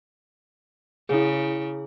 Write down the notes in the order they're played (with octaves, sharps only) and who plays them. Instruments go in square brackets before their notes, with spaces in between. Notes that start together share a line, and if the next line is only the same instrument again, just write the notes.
[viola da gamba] C#3 [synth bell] E4 G#4